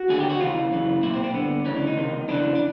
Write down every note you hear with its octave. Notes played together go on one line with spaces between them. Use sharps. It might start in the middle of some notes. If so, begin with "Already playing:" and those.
Already playing: F#4
D#2 D3 G#4
G4
F#4
D#2 C#3 E3 F4
F#2 C#3 E3
B1 A#2 E4
C4
C4
G2 D3 B3
D2 C#3 E3 C#4
D4
D#4
C#2 C3 D#3
F2 C#3 E3 D4
D4